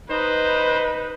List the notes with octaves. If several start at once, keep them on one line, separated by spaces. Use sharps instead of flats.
D#4 B4 C5